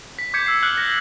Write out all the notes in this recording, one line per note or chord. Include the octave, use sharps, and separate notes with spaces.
B6
D6 G6 G#6 B6 C#7
E6 B6 C7
F6 F#6 C#7 F#7
A#6 C#7